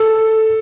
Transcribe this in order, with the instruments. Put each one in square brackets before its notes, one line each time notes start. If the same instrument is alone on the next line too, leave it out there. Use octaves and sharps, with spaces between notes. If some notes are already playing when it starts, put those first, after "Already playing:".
Already playing: [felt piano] A4